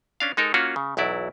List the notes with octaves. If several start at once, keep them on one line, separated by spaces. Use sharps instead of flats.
C#4 D4 F5
G#3 D#4 A4 A#4
A#3 C#4 F4 F#4
C#3
B1 E2 F#3 E4 D5